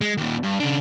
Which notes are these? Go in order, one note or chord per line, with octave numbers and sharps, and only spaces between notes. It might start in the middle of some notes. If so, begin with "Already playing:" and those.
G#3
D#2 A#2
G2
C#3 D4